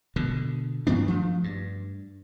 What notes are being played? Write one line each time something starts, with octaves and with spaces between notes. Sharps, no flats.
B2 D3
G2 D#3 B3 D4
F3 A3
G2